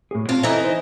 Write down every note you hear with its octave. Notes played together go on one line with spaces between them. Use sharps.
A2 G#4
C4 F4 F5 A5
E3 D#4 A4 C5 E5
C5